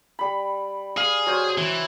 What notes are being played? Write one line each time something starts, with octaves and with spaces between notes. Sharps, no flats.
G3 B5
G#4 F5
F#3 C5
E3